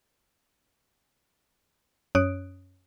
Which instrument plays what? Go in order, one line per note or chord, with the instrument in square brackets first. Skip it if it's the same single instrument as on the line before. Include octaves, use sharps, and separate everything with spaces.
[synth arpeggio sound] F#2 C#4 C#5 D#6 F#6 D7